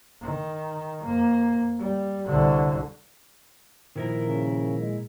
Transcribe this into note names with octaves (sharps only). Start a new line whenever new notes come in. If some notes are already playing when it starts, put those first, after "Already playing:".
D#3
F2 A#3
G3
C2 D3
A#2 D#3 F3 E4 A#4
C#3
G#3